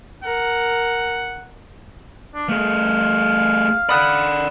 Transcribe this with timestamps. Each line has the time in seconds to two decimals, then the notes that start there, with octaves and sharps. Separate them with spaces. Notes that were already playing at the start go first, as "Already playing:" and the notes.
0.24 A#4 F#5
2.35 D4
2.49 A3 G#4 F5
3.89 D5 F#5 B5 D#6 F#6